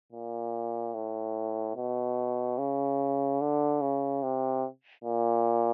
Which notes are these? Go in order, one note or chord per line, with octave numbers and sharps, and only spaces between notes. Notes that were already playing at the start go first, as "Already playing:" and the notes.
A#2
A2
B2
C#3
D3
C#3
C3
A#2